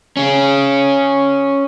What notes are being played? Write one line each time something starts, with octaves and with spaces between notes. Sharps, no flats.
C#4 G#4